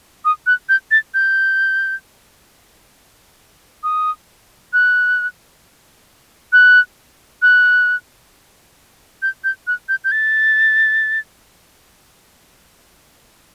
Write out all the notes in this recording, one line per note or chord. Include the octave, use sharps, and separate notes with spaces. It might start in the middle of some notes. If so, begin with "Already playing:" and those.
D#6
F#6
G6
A6
G6
D#6
F#6
F#6
F#6
G6
G6
F#6
G6
G6
A6